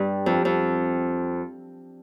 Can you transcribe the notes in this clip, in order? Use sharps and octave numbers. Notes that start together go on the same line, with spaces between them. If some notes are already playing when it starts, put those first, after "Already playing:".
Already playing: G2
F2
F2